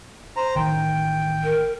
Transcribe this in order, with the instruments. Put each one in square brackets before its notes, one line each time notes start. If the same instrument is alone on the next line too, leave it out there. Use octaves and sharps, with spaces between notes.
[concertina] C5 A#5
[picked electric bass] A1 D#3 [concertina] G5
[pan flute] A#4